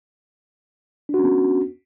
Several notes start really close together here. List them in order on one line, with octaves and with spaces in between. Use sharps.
D4 F#4 C#4 B3